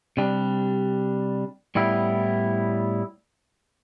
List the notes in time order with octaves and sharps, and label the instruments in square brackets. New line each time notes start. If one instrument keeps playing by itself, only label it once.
[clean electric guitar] C3 G3 D4
A2 G3 B3 E4